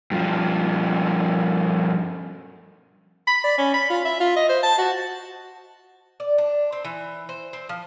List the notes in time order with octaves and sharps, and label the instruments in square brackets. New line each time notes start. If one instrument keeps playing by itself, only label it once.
[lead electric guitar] G2 F3
[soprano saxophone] B5
D5
C#4
B5
F4
E5
F4
D#5
C5
A5
F#4
[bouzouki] D5
D4
C4
E3
C5
C4
F3